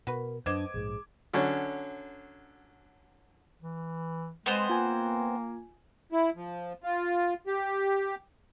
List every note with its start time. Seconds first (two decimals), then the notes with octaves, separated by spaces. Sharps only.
0.07 B2 F#4 A#4 B4
0.46 F#2 B3 D4 C5 D#5 D6 G#6 E7
0.74 A#1 G#2 G#4
1.33 D3 F#3 C#4
3.62 E3
4.46 G#3 B3 C4 C5 C6 D#6
4.69 A#3 F4 G#5
6.12 E4
6.36 F3
6.84 F4
7.47 G4